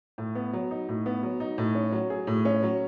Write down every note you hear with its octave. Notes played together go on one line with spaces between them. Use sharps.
A2
B3
F#3
D#4
A2
B3
F#3
D#4
A2
C#4
F#3
G#4
A2
C#4
F#3